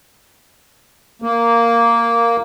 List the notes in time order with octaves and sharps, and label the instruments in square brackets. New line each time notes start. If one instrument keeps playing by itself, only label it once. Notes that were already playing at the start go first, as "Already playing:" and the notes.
[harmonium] A#3